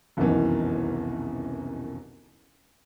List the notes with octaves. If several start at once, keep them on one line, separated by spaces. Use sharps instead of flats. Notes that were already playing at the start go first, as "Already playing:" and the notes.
F1 C2 F#2 B2 D#3 E3